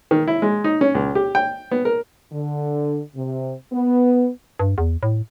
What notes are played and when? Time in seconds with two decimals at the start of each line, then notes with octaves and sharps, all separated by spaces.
0.11 D#3
0.28 E4
0.42 G#3
0.64 D#4
0.81 C#4
0.95 C#2
1.15 G4
1.35 G5
1.71 B3
1.85 A#4
2.33 D3
3.16 C3
3.73 B3
4.59 G2
4.78 E2
5.03 A2